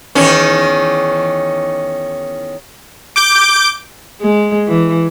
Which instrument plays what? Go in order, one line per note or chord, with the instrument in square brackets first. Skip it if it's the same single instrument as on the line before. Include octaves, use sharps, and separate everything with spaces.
[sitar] E2 D#3 C#4
[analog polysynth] D6 G6 D7
[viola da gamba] G#3
E3